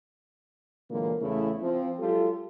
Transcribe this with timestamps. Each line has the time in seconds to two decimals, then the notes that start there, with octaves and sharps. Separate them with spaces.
0.90 A#2 D3 E3 F#3 G#3 A#3
1.21 E2 C#3 A3 E4
1.61 F3 C4
1.98 F#3 G#3 F4 G4 A4